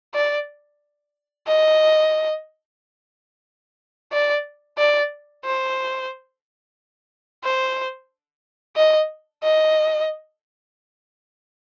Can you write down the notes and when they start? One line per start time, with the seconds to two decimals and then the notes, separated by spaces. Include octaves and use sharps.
0.14 D5
1.48 D#5
4.12 D5
4.78 D5
5.45 C5
7.44 C5
8.76 D#5
9.43 D#5